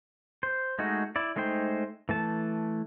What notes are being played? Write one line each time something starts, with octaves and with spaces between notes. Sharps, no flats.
C5
G#3 A3 D#4 F#4
E4 D5
G#3 A3 D#4 C5 G5
E3 A3 A5